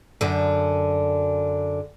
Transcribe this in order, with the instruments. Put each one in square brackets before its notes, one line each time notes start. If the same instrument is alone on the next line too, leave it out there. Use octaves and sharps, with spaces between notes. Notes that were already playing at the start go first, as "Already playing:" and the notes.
[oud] F#2 D3